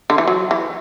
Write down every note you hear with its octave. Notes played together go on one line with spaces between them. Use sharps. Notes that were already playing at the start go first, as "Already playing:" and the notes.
D3
E3
F#3
E3